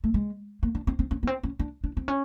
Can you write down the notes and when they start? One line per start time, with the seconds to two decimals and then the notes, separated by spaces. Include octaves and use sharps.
0.04 A3
0.14 G#3
0.63 A#3
0.75 D4
0.87 C4
0.99 C4
1.11 C#4
1.23 B3
1.27 C4
1.43 C#4
1.59 D4
1.84 D4
1.97 C4
2.08 C#4